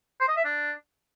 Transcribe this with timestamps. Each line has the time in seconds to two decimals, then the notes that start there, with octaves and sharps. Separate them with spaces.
0.20 C5
0.29 D#5
0.37 E5
0.45 D4